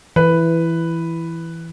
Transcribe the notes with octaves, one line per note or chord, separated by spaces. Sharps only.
E3 B4